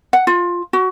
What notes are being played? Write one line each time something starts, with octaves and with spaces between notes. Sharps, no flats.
F#5
F4
F#4